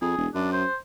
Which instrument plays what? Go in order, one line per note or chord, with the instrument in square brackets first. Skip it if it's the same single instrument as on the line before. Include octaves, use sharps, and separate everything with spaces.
[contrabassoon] F2 [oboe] G#4
[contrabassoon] E1
[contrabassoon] F#2 [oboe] D4
[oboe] C5